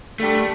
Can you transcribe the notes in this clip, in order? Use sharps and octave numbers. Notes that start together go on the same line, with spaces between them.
D3 G3 A3 D4